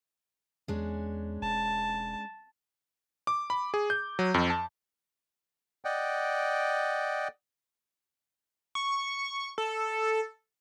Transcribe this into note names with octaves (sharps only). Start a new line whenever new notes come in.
E2 G#3 C#4 D4
E1 A5
D6
B5
G#4
G6
F#3
F2
A5
D5 D#5 F#5 G5
C#6
A4